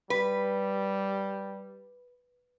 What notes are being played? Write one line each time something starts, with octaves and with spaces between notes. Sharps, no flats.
G3 B4